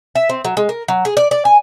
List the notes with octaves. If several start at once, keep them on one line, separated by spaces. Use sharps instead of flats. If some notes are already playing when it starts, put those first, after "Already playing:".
E5
C4
F#3
G#3
A#4
F#3
G#4
D5
D5
G#5